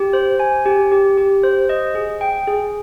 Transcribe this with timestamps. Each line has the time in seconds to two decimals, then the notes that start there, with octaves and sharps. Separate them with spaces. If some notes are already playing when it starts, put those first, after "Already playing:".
Already playing: G4
0.13 C5
0.40 G#5
0.65 G4
0.92 G4
1.17 G4
1.43 C5
1.69 D#5
1.95 G#4
2.21 G5
2.47 G#4